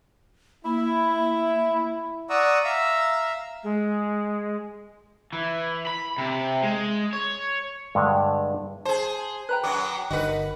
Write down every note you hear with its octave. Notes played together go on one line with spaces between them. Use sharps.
A#3 E4
D5 F#5 A#5 C#6 D#6 E6
E5 F5 A#5 E6
G#3
E3
B5
C3
G#3
C#5
G2 D3 G#3
G#4 C5 A5
B4 G5 A#5 F#6
F#2 F#3 D6
G1 D3 D#4 F#4 A#4 B4